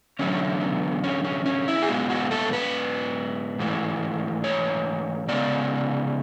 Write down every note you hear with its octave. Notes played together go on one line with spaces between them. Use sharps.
E2 D3 F#3 A3 C#4
B3
C#4
C#4
C#4
E4
G#4
G#2 G#3 B3 F#4
F#4
A4
B4
G#2 E3 A3
C#5
C#3 G#3 B3 D5